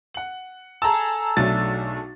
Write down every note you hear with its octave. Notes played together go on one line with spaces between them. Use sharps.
F#5 F#7
G#4 A4 A5 A#5 E6
B1 F#3 A3 D4 A6